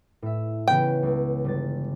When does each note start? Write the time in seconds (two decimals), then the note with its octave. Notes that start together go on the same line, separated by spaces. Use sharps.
0.22 A2 E5
0.68 C#3 E3 B3 G5
1.03 C#2 G#3
1.45 G1 A6